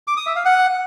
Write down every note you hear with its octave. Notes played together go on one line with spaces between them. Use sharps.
D6
D#6
E5
F5
F#5